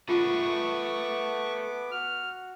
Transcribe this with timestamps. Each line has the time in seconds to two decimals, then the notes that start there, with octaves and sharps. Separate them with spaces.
0.09 A3 B3 F4 G#4 B4 C#6 D6
1.91 F#4 F6